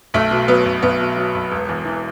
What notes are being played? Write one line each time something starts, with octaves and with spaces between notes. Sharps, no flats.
B1 A3
B2
F#3 B3
B1
B1 B3
B2
F#3
B1
E1
E2
E3